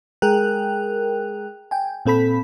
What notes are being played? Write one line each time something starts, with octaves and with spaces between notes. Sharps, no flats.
G#3 G#4 A#4 G5 F#6
G5 G#5
A#2 C4 A4 B5 B6